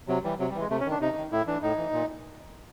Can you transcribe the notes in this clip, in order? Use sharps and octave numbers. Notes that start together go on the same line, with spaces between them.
C3 F#3
E3 G3
C3 F#3
G3
E3
G#3
C3 A3
C#4
D#3
D4
C3 D#4
D#3
A2 E4
E3 D4
A2 D#4
E3
A#2